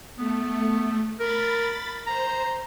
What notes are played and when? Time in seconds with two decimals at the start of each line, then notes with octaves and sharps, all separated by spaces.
0.19 A3 B3
1.20 A#4 B5 A6
2.07 C5 A#5